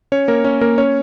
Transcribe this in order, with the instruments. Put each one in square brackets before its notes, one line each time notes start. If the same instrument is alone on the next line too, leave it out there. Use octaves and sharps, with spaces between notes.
[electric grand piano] C#4 C#5
A#3 A#4
C#4 C#5
A#3 A#4
C#4 C#5